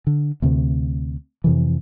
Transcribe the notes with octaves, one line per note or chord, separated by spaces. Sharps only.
D3
D2 C3
F2 C3 E3